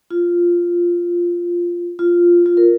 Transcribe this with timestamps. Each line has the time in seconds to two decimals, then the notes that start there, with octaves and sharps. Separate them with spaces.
0.11 F4
1.99 F4
2.46 F4
2.57 A#4